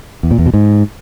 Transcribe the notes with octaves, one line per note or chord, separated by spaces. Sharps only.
E2
A#2
E2
B2
G#2